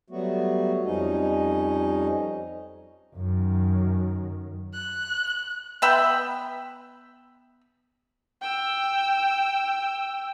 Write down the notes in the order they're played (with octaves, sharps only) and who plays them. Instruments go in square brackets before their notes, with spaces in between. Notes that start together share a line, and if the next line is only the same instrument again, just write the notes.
[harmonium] F#3 G3 A3 B3 F#4
F2 F3 G3 C#4 D#4 D#5
[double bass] F#2 D#3
[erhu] F#6
[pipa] B3 E5 G5 B5
[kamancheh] G5 E6